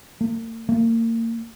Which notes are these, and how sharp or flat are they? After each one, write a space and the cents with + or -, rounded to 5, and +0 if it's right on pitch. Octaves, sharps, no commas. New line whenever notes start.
A#3 -45
A#3 -35